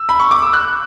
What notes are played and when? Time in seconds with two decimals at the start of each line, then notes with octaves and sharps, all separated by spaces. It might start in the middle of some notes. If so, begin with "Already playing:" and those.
Already playing: E6
0.09 B5
0.20 C#6
0.31 D6
0.42 E6
0.53 F#6